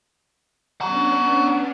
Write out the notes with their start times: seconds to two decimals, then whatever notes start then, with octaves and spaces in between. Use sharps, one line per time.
0.81 B3 C#4 D4 F#5 A#5